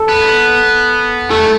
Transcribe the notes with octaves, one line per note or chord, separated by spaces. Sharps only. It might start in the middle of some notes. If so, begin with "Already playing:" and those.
Already playing: A4
B3
A3 A4